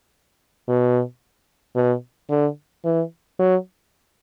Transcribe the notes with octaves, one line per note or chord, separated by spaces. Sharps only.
B2
B2
D3
E3
F#3